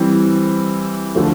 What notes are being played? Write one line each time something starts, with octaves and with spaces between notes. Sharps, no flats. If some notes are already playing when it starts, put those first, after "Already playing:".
Already playing: E3 G3 C4
D3 F3 A3